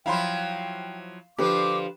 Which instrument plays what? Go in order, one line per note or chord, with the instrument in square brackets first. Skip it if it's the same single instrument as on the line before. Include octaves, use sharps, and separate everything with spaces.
[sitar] F3 F#3 E4 [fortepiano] F5 B5 C6 [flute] G5
[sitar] D3 F3 C5 [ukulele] G4 B4 [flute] D6